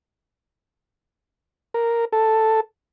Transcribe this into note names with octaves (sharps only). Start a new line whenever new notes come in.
A#4
A4